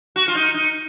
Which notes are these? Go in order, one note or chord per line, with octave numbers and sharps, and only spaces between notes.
F#4
F4
D#4
D#4